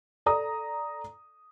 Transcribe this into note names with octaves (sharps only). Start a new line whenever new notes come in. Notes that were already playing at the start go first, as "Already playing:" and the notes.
A4 D5 A#5 D#6